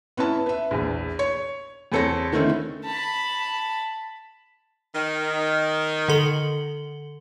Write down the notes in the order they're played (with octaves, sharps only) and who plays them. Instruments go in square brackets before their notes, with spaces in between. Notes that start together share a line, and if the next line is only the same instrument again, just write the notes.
[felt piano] B3 C#4 E4 A5
B4 E5
A#1 E2
C#5
E2 C4 A4 C#5 A#6
D3 D#3 A3 C4 C#4 E4
[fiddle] A5 B5
[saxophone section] D#3
[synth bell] D3 A4 F#7